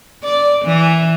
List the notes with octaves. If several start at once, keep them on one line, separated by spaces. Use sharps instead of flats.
D5
E3